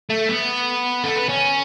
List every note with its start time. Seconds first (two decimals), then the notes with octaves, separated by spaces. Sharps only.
0.10 A3
0.29 B3
1.04 A3
1.16 B3
1.29 C#4